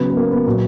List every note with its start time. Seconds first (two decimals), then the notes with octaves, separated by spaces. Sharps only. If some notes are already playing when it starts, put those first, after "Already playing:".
Already playing: C#3 F#3 B3
0.10 B3
0.17 A#3
0.32 B3
0.46 A#2 F#3